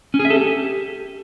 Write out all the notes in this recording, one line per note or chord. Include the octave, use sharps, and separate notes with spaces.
C#4
G#4
E5
A4
G4